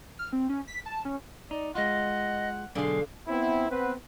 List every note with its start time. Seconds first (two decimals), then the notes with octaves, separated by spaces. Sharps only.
0.19 F6
0.33 C4
0.49 C#4
0.67 B6
0.86 A5
1.05 C#4
1.51 D#4 D5
1.75 G#3 F4 D#5 F#5
2.75 B1 D3 G#4 F5 C6
3.27 B3 C4 E4
3.69 B3 C4 B4